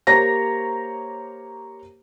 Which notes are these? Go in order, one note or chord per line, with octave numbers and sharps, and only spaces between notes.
A#3 G4 C5 C#5 A#5 A#6